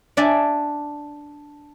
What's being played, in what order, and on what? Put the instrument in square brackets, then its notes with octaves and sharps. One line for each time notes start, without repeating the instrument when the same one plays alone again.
[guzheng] D4 D5 E5 G#5